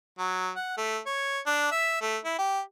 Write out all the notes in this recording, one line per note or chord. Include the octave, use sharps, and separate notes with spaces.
F#3
F#5
A3
C#5
D4
E5
A3
E4
G4